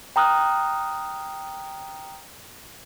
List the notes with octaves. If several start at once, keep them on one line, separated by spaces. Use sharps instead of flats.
G5 A#5 D#6 F6 F#6